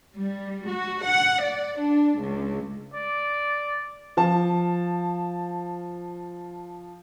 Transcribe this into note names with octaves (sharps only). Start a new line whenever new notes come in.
G3
F#4
F#5
D5
D4
C#2
D5
F3 A5